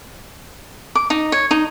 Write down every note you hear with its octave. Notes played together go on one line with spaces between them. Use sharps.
D6
D#4
C#5
D#4